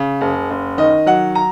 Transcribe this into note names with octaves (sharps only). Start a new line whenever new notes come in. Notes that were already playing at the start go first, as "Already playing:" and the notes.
Already playing: C#3
F#1
F#1
D#3 D#5
F#3 F#5
A#5